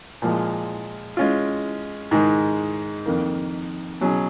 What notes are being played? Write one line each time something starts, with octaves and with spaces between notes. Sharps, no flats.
A#2 F3 G#3
G#3 C#4 F4
G#2 D#3 G#3
F2 D#3 A#3
B2 F#3 C#4 G#4